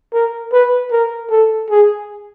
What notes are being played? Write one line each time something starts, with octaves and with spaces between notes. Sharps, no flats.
A#4
B4
A#4
A4
G#4